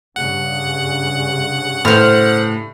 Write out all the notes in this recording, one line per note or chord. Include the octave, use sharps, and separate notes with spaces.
G2 C#3 F#5
A2 C5 F6